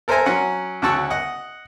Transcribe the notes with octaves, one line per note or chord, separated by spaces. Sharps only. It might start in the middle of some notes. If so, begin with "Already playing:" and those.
A4 A#4 C5 E5 G#5 A#5
F#3 C#4 F#5
D2 C#3 F#4 A5 C#6 E6
D#5 F#5